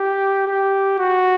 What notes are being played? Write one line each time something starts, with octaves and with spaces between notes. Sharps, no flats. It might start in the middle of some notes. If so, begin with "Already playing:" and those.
Already playing: G4
G4
F#4